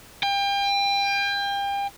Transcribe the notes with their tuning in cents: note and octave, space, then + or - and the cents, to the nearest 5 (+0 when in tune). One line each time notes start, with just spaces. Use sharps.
G5 +35